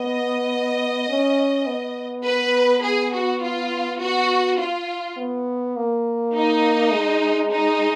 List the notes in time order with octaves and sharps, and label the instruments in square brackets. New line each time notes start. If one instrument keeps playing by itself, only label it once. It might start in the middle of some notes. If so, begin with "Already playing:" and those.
Already playing: [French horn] B3 [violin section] D#5
[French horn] C#4
B3
[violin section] B4
G#4
F#4
F4
[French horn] B3 [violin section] F#4
[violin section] F4
[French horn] B3
A#3
[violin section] D#4
[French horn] G#3
[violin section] D#4